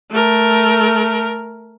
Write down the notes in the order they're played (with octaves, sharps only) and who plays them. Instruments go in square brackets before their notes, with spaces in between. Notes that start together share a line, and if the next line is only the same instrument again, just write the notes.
[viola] A3 A#4